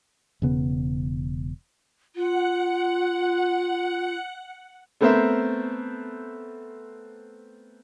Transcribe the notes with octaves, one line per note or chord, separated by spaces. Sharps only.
E1 C#3 B3
F4 F#5
A3 B3 C4 A#4 C5 E5